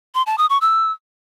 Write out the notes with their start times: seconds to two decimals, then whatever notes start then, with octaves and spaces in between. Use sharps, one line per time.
0.15 C6
0.26 A5
0.38 D#6
0.50 C#6
0.61 E6